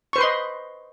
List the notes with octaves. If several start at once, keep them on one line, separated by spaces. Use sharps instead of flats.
B4 C5 D#5 C6 C#6